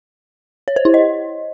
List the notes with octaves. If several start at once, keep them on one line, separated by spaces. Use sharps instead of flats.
C#5
C5
E4
D#5